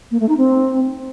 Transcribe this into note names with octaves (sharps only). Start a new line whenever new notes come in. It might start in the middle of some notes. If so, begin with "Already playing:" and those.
A#3
A3
D#4
C4